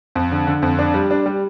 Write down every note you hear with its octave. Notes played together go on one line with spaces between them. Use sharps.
F2
D3
D3
F2
D4
G3
D4
G3